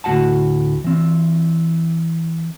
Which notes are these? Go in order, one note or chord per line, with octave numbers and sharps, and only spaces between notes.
D2 A2 F#4 F#5 A5
E3 C4